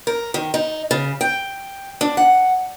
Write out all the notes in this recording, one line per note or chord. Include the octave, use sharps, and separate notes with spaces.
A#4
D#3
D#4
C#3
G5
D4
F#5